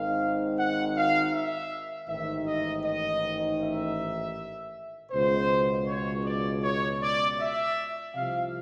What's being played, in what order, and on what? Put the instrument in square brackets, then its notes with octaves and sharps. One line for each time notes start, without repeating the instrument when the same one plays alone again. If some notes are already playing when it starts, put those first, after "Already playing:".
Already playing: [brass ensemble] G#1 G#2 D#3 F5
F#5
F5
E5
A1 G#2 D#3 E5
D#5
D#5
E5
C#2 B2 C5
C#5
D5
C#5
D5
E5
C2 C3 F3 F5